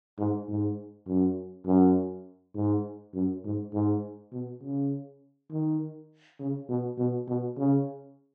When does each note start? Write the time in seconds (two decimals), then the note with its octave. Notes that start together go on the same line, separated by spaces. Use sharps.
0.18 G#2
0.48 G#2
1.08 F#2
1.67 F#2
2.55 G#2
3.14 F#2
3.44 G#2
3.73 G#2
4.32 B2
4.62 C#3
5.51 D#3
6.39 C#3
6.69 B2
6.98 B2
7.28 B2
7.57 C#3